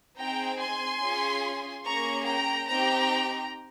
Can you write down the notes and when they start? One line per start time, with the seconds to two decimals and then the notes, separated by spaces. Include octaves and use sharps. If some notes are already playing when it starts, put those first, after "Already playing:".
0.18 C4 D#4 G#4 G5 A#5
0.60 G#5 C6
1.02 C#4 F4 G#4
1.85 A#3 C#4 G#4 A#5 C#6
2.27 G5 A#5
2.69 C4 D#4 G4 G5 A#5